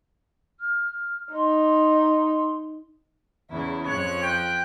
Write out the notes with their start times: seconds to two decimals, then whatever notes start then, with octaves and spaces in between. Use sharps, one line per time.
0.59 F6
1.33 D#4 C6
3.51 E2 C#3 E4
3.87 F2 C#5 F#6
4.22 G5